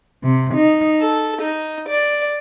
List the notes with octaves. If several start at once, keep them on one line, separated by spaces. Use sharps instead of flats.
C3
D#4
A4
D#4
D5